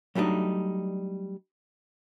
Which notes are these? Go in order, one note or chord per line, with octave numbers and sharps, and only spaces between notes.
F#3 G3 A3 D4 D#4